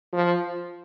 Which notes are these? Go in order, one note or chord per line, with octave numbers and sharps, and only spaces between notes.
F3